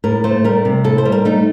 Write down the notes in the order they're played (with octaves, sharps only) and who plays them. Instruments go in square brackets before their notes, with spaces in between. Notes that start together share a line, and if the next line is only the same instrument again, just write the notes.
[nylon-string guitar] A2 A#4
A3 C5
G3 A#4
C3
A2 A4
C5
G3
A#4
A3 D#4